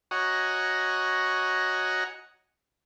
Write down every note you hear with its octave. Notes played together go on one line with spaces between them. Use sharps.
F#4 C#5 D#5 F#5 G#5 A#5